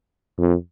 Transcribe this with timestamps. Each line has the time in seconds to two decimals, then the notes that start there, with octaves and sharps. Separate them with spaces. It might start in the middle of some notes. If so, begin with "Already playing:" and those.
0.39 F2